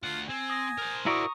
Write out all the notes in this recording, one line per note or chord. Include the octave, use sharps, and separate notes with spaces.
D2 F4 F#5
C4 G#5
D#6 A#6
A#4 C5
E4 F#4 D5 A#5 C#6 D#6